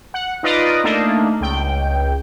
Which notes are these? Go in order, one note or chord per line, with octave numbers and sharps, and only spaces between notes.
F#5
D#4 F4 B4 D5 D#5
A3 A#3 D4 D#4
C#2 G5